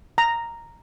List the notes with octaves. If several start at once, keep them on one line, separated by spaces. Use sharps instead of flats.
A#5